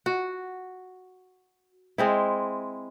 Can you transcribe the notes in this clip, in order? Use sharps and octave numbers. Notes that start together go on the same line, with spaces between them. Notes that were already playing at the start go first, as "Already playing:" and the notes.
F#4
G#3 C4 E4